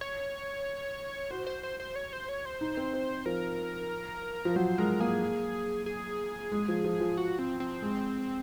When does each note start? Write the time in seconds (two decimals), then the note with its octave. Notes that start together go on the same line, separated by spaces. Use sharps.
0.01 C#5
1.30 F#4 C5
1.47 C5
1.63 C5
1.80 C5
1.96 C#5
2.13 C5
2.29 C#5
2.45 C5
2.61 D#4
2.77 C4
2.93 C4
3.26 F3 A#4
4.45 F3
4.56 F#3 C5
4.78 G#3 A#4
5.00 A#3 G#4
5.86 G#4
6.52 G#3
6.68 F3
6.84 F3
7.00 F3
7.18 F#4
7.39 C4
7.60 C4
7.82 G#3